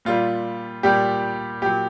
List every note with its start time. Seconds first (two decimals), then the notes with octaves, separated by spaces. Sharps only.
0.05 A#2 G3 F4
0.83 A#2 G3 G4
1.62 A#2 F#3 G4